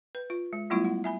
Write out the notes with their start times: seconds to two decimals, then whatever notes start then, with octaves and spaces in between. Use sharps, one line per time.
0.15 B4
0.30 F4
0.53 G#3
0.70 F#3 G3 A3 B3 E4 F4
0.85 F#5
1.04 E5 G#5 B5